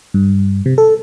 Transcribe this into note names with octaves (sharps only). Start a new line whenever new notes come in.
G2
C3
A4